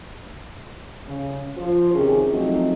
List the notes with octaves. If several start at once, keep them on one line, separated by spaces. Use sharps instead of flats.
C#3
F3 F4 C5
C3 D#3 C#4 G#4
F3 F#3 A3 C4 D#4